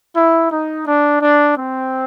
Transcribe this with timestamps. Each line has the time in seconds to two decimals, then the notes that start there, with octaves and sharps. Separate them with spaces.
0.16 E4
0.51 D#4
0.86 D4
1.22 D4
1.58 C4